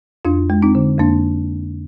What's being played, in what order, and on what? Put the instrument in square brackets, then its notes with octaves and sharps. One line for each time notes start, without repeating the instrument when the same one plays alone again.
[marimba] F2 D4 F4
G#3
C4 D#4
D3
F2 A#3 D4